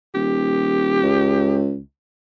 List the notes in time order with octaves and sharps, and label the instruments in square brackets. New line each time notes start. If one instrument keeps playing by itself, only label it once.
[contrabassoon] D#1 [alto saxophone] G4
[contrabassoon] C#2